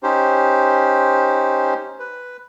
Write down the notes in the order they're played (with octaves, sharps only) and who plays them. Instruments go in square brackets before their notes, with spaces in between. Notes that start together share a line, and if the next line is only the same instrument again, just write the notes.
[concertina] C#4 D#4 G4 C5
B4